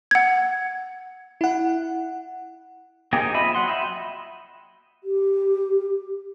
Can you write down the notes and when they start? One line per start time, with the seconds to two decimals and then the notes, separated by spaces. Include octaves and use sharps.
0.11 F#5 G#6
1.41 E4 F#5
3.13 A#3 C4 D#4 G4 G#4
3.34 F4 D#5 E5 B5
3.54 F#3 F#5 C6
3.68 D#5 E5 G5 B5
5.04 G4